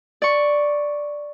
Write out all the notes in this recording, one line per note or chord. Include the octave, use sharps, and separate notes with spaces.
D5 C#6